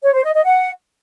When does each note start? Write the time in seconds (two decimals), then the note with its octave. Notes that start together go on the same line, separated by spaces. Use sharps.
0.03 C#5
0.14 C5
0.24 D#5
0.34 D#5
0.44 F#5